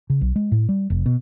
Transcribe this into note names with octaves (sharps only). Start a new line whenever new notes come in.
C#3
B1
G#3
A2
G3
F1
B2